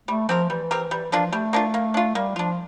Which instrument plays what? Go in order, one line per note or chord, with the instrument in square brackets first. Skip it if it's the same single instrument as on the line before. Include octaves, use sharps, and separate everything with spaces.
[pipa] G3 [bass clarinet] A3
[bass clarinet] F3 [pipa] C4 G4 A#4
[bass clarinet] E3 [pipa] G3
[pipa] C4 G4 A#4
[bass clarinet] E3 [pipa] G3
[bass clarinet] F3 [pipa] A#3 D4 F4
[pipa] G3 [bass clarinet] A3
[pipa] A#3 D4 F4
A#3
D4 F4
[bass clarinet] G3 [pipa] A#3
[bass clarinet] F3 [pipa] D4 F4